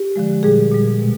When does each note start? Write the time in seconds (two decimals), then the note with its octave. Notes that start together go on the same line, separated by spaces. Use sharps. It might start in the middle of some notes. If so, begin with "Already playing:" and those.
Already playing: G4
0.16 D3 F3 G#3
0.43 A#2 G3 G#4
0.72 A#2 G3
0.99 B2 G#3